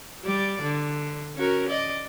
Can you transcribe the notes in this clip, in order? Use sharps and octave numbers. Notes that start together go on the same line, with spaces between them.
G3 D5
D3
C#4 F#4 A#4
D5 D#5